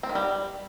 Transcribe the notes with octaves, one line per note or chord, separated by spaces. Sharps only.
C4
D#3
G3